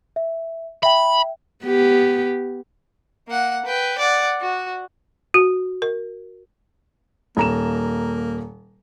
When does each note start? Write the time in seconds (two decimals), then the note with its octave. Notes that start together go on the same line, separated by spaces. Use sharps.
0.16 E5
0.83 E5 G5 B5
1.64 B3 G4
3.28 A#3 F#5
3.65 B4 G5
3.98 D5 F#5
4.41 F#4
5.34 F#4
5.82 A#4
7.37 D#1 A#3 A#5 E7